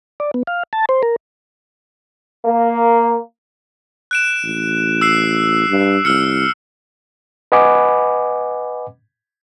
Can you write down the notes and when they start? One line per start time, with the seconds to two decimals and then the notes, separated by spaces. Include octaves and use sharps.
0.20 D5
0.34 B3
0.47 F5
0.73 A5
0.89 C5
1.03 A#4
2.46 A#3
4.11 F#6 D7 E7
4.44 A1
5.01 E6 F#6 C7
5.69 G2
6.05 C2 E6 F6 C#7
7.52 B4 D#5 F#5 G#5 B5 D6